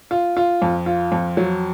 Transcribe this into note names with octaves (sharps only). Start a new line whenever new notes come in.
F4
F4
F2
F4
F2
F#3